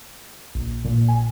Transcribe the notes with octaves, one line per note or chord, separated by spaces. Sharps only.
A#1
A#2
G#5